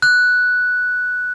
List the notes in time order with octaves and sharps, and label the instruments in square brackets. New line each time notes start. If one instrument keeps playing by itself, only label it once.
[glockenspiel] F#6